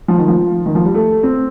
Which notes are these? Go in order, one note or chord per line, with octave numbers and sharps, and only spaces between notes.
F3
D#3
F3
D#3
F3
G3
A3
C4